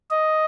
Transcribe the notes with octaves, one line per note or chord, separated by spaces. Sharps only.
D#5